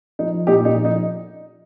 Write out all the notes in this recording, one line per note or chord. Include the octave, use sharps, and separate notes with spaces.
F3 D#4
A#2 D#4 G4
D#4
F3
D#4